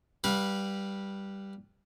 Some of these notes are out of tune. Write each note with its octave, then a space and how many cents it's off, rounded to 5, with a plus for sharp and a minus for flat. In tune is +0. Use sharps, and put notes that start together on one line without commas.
G3 +0 B4 -15 F5 +30